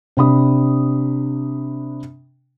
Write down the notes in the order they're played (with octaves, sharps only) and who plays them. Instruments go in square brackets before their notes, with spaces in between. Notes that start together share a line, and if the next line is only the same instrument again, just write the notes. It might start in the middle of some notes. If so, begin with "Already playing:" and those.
[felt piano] C3 D4 B5 D#6